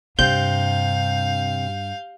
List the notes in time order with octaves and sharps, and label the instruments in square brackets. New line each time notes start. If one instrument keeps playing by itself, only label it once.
[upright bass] G2 D4 [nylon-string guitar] C3 [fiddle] F5 [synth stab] G6